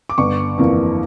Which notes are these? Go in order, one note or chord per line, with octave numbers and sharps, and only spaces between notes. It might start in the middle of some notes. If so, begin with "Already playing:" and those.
D6
G1 C#6
F2 E3 A#3